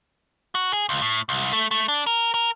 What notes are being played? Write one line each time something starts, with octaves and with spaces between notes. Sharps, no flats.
F#4
G#4
C#2
A2
C2
A3
A3
D4
A#4
A#4